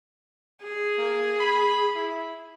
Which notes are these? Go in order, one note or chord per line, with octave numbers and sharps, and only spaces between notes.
G#4
A#3
B5
E4